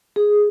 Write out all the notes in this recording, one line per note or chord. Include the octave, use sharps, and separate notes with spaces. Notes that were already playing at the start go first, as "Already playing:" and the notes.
G#4